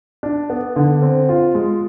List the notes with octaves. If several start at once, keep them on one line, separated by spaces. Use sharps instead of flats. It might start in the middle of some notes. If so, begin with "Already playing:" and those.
D4
B3
D3
C4
F4
G#3